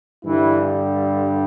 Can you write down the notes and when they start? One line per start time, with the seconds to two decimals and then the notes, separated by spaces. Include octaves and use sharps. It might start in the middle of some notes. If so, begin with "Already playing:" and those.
0.24 G2 D3 E3 G3 E4